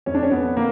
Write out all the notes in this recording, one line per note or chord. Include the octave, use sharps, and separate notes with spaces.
F2 C#4
D4
C#4
F2 B3
D3 A#3